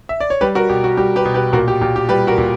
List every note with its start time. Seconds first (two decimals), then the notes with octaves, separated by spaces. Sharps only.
0.09 E5
0.20 D5
0.30 C#5
0.41 G3 G4 B4
0.55 F#4 A#4
0.69 B2 G4
0.84 F#4
0.97 G3 G4
1.16 G4 B4
1.25 B2
1.34 G4 B4
1.53 A#2 F#4 A#4
1.68 G4
1.81 A#2 G4
1.96 G4
2.09 G3 G4 B4
2.27 F#4 A#4
2.38 A#2